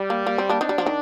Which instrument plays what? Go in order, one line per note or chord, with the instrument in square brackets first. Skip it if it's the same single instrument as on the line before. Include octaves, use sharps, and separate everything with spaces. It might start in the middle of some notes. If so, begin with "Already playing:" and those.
Already playing: [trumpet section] G3
[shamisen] A#3
A#3
C4
A#3 D4
[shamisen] C4 D#4 [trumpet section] D4
[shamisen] G3
F3
D#3